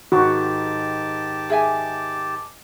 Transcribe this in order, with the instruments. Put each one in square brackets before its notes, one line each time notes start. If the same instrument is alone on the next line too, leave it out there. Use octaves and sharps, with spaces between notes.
[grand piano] G#2 D#3 [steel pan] F#4 [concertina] G4 A5 D6
[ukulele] G#4 E5 G#5